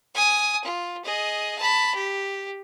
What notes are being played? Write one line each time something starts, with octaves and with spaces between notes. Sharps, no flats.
G#5 D#6
F4
G#4 D#5
A5 B5
G4